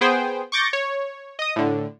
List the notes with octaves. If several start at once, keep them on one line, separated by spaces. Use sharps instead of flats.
B3 G#4 C5 G5
C#6 D6 G6 A6 A#6 C#7
C#5
D#5 D#6
A2 D3